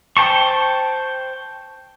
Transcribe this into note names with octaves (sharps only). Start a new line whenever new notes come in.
C5 G5 A5 C#6